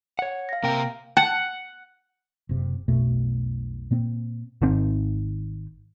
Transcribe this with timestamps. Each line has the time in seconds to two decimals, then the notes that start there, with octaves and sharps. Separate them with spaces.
0.19 C#5 F#5
0.49 F5 A#6
0.63 C3 A#3 A#4 G5
1.17 F#5 G5 A5
2.49 F#1 C3
2.88 B1 F2 B2 A3
3.91 A#2 A#3 C4
4.62 G#1 D#3 C4